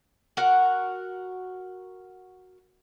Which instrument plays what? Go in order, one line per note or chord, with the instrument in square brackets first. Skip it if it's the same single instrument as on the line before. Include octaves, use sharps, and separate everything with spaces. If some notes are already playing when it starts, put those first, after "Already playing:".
[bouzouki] F#4 A#4 F#5